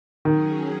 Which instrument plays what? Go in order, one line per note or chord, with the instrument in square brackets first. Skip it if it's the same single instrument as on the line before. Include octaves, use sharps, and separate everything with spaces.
[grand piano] D#3 [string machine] F#3 C#4 G#4